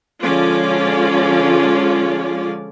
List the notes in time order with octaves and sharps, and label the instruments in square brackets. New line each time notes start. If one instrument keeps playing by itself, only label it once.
[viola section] D3 F3 G#3 C#4 F4 D5